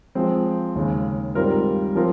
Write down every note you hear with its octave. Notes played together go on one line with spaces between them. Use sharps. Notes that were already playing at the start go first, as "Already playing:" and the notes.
F3 G#3 C4
D#2 C#3 G#3
G#2 G3 C4 F4 A#4
F3 C4 F4 A#4